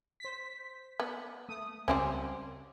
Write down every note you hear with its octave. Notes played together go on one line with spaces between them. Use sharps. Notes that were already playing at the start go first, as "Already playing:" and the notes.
C5 B6
B3
A3 D#6
C#2 G3 C4 C#4